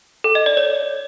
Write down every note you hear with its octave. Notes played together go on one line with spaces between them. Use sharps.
A4
D#5
D5
C#5